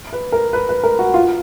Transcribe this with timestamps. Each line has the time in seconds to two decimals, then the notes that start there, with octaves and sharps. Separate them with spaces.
0.13 B4
0.32 A#4
0.53 B4
0.69 B4
0.83 A#4
0.99 F#4
1.14 F4